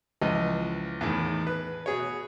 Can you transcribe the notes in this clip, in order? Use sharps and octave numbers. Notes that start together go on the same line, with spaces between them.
C#2 E3 F3 D#5
E2 A2 D#3
B4
B2 G#4 C#5